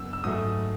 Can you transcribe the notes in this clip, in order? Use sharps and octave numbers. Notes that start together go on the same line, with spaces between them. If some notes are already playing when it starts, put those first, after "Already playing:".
Already playing: F#2 C#3 B3 E6
E6
G#2 F#3 A3 D#6